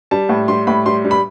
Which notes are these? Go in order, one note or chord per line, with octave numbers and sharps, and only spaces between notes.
G3 A5
A2
G3 C6
A2 B5
G3 C6
G3
B5